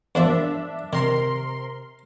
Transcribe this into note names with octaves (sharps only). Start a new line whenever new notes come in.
E2 A#2 F3 D4 E5
C3 D#3 A#4 C6